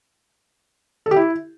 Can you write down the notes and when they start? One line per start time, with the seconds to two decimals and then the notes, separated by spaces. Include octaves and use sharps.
1.06 A4
1.11 G4
1.16 E4